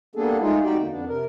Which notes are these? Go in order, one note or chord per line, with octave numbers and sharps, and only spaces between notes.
G3 A#3 B3 D4 G#4 A4
G#3 A3 D#4 F4 G#4
F2 D#4 F#4 G4 D5 G5
E2 D3 A#3
F2 B3 D4
C3 A#4